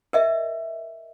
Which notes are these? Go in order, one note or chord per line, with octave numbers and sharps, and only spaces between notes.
A#4 D#5 E5